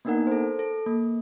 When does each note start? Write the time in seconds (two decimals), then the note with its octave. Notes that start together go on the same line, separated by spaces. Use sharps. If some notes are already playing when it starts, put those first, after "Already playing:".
0.05 A#3 B3 D4 D#4 A#4 F#5
0.27 A4 C5
0.59 A4
0.86 A#3